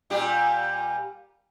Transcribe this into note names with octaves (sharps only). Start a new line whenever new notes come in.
A#2 G3 G4